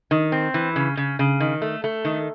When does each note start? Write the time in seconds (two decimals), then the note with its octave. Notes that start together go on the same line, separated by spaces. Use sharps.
0.11 D#3
0.32 C4
0.54 E3
0.76 C#3
0.97 C#3
1.19 C#3
1.40 D#3
1.62 A3
1.84 A3
2.05 D#3